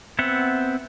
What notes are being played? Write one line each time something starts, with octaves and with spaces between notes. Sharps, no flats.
B3 C4 E5 F#5